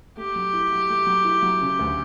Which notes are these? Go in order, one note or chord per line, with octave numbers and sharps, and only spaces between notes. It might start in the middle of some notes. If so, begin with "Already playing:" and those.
A3 G4
F#3
E4
F#3
A3
F#3
E4
F#3
C#3
D2